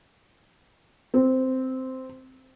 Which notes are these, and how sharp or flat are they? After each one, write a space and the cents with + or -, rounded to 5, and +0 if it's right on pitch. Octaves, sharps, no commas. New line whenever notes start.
C4 -5